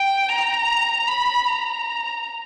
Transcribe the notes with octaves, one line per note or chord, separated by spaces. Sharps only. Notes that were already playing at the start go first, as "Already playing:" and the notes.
Already playing: G5
A#5
B5
A#5